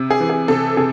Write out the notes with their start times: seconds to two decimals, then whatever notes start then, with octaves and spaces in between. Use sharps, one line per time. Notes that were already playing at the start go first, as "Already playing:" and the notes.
Already playing: C3
0.10 G#4
0.20 E3
0.30 G#4
0.48 C3 A4
0.77 C3 G#4